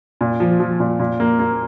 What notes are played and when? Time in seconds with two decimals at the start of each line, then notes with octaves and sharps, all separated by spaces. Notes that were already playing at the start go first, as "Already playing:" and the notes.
0.21 A#2
0.40 F3
0.60 F3
0.80 A#2
0.99 A#2
1.20 A#3
1.39 A#3